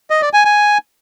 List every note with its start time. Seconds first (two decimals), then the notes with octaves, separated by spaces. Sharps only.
0.10 D#5
0.22 D5
0.33 G#5
0.45 G#5